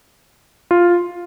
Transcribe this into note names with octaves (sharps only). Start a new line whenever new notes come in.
F4